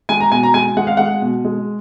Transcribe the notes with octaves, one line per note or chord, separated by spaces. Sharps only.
G#3 G#5
A#5
B2 G#5
A#5
G#3 G#5
G#3 F#5
F5
G#3 F#5
B2
G#3